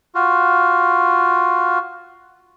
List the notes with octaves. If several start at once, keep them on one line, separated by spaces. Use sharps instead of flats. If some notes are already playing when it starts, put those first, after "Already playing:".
F4 F#4